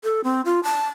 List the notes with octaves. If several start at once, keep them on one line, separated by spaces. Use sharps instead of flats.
A4
C4
F4
A5